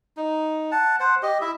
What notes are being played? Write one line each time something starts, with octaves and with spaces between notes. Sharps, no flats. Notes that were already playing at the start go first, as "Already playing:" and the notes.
D#4
F#5 A5
C5 F#5
G4 D#5
E4 E5